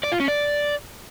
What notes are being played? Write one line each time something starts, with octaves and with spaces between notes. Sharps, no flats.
D5
F4
C#4
D5